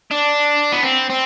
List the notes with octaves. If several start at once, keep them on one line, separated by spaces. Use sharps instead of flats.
D4
B3
C4
C4